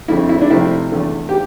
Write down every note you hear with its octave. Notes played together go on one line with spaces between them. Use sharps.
F2 D3 A3 C4 E4
E4
D4
C3 F3 A3 C4 E4
E2 D3 A3
G4